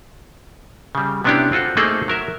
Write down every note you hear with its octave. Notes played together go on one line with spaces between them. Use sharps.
C#3 G3
C3 B3 C#4 D4 E4 G4
C4 F4 F#4 A4
A3 A#3 C4 D#4 G#4 A4
F#3 A#4 E5